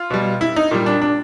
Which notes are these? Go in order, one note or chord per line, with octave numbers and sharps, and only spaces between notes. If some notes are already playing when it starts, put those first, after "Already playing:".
Already playing: F4
B2 G3
E4
D#4
A#2 G3
D4
D4